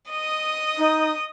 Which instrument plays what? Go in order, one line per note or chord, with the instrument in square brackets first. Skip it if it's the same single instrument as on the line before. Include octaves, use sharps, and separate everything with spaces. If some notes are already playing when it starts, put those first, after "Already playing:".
[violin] D#5 D#6
[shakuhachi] D#4